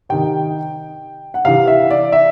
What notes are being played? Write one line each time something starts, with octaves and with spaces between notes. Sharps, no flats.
C3 D#3 G5
F#5
C3 E3 F5
E5
D5
E5